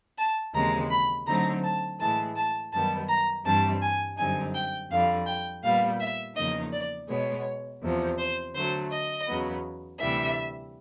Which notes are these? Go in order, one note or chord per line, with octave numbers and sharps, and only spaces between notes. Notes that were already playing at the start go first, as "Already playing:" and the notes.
A5
D#2 C#3 E3 G#3 C4 A#5
B5
D3 F#3 A3 C4 D#4 A#5
A5
A2 E3 G#3 A5
A5
F#2 D#3 G3 B3 A5
A#5
G2 E3 G3 C4 A5
G#5
F#2 D3 G3 C4 D#4 G#5
G5
F2 D3 G3 F5
G5
A#2 G3 B3 F5
E5
E2 C#3 F3 A#3 D#4 D#5
D5
B2 G#3 B3 C#5
E2 C3 F3
C5
D3 F#3 A3 C5
D#5
E2 C#3 F#3 B3
D2 C3 E3 G3 E5